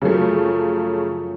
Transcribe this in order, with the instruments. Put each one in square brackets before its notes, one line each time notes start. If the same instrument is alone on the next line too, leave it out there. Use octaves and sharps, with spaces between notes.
[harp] F#2 F3 C#6 [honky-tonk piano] C#3 A3